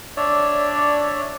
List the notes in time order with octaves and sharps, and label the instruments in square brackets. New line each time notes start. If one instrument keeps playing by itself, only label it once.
[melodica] D4 C#5 D5 E5